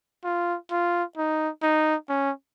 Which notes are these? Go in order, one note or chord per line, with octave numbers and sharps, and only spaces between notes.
F4
F4
D#4
D#4
C#4